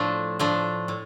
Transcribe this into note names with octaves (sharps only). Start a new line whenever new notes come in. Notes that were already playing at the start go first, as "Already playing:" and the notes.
Already playing: A2 F3 A3 D4
A2 F3 A3 D4
A2